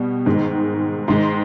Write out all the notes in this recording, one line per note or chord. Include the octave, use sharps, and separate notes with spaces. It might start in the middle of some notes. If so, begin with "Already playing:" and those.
Already playing: B2 G3
G#2 D#3 G#3
G#2 D#3 G#3 C6